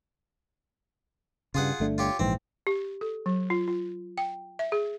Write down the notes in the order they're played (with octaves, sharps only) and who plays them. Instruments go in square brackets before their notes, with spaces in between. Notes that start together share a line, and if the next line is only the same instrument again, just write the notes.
[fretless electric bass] G2 C#3 [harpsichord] F4 G#4 F#5
[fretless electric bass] G1 A3 D4
[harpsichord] F4 G4 C#5
[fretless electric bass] A#1 G#2 E3 [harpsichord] C4
[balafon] G4
A4
F#3
F4
F4
G5
E5
G#4